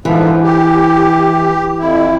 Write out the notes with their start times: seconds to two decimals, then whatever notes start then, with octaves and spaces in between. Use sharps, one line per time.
0.05 G#2 D3 E3 F3
0.43 G4
1.79 F2 E4